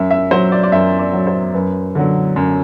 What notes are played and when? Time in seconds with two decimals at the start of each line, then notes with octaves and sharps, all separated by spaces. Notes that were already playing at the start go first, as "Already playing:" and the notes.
Already playing: F#2 E5
0.11 E5
0.31 F#3 C5
0.52 D5
0.63 D5
0.72 F#2 E5
0.99 D5
1.13 F#3
1.27 C5
1.54 F#2 B4
1.95 D3 F#3
2.36 F#2